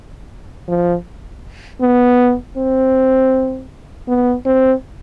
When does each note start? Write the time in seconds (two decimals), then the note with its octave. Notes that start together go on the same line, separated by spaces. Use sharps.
0.68 F3
1.81 B3
2.57 C4
4.08 B3
4.46 C4